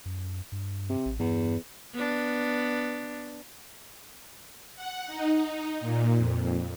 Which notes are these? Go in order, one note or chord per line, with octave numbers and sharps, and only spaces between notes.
F#2
G2
C3
A1
E2 G2
B3 D4
F#5
D#4
A#2
F2